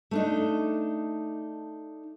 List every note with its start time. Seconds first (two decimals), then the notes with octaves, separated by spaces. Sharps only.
0.11 A3 D4 D#4